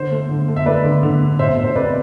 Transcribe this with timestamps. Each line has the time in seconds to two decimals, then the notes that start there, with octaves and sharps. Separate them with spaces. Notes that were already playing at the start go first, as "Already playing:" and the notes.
Already playing: D3 C5
0.11 A3
0.29 D3
0.48 A3
0.56 E5
0.65 A3 B4 D5
0.84 D3
1.03 D3
1.21 A3
1.39 B2 C5 E5
1.57 B2
1.64 C5
1.75 C4 B4 D5